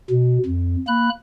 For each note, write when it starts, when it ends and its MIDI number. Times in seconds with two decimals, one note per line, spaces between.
0.10 0.38 47
0.46 0.76 41
0.88 1.10 58
0.88 1.10 83
0.88 1.10 90